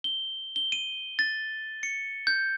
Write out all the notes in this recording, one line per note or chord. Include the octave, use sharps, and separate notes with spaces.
G7
G7
D#7
A6
C#7
G6